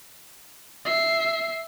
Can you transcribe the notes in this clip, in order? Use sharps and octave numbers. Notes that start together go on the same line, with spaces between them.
E5 C7